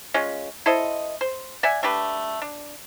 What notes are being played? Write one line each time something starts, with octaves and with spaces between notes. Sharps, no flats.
G#3 C#4 F4
E4 A4 C5 D#5
C5
D5 E5 F#5 G#5
A3 D4 G4 B4
D4